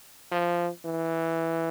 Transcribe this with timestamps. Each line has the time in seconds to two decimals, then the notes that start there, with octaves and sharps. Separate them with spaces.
0.32 F3
0.85 E3